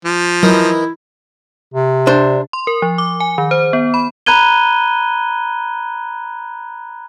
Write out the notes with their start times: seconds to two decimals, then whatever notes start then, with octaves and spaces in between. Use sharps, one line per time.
0.05 F3
0.43 E3 F#3 D#4 E4 A#4
1.74 C3
2.07 D4 C5
2.53 C6
2.67 A#4
2.82 F3
2.98 D6
3.20 G#5
3.38 D#3
3.51 C5
3.73 B3
3.94 B5
4.26 A#5 B5 F#6 G#6 D#7 G7